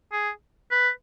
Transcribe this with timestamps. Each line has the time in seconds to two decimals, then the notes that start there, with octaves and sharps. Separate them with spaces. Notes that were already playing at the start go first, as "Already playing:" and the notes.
0.12 G#4
0.71 B4